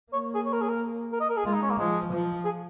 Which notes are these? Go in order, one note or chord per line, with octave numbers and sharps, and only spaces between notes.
A#3 C#5
G#4
C#5
A#4
G#4
A#4
A#4
D#5
A#4
G#4
G#3 F4
D#4
C#4
A#3
F3 G#3
F3
G#4